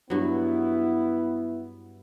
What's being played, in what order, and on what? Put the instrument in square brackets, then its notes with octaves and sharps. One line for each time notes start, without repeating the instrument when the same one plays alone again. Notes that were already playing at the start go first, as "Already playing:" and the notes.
[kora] G2 F#3 [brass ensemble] B3 E4